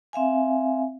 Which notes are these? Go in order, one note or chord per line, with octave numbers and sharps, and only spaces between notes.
C4 E5 F5 G#5